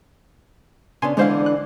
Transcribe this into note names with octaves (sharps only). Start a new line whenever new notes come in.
C#3 B3 D4 G#5 C6
D3 E3 G#3 D4 C5 F5
F#6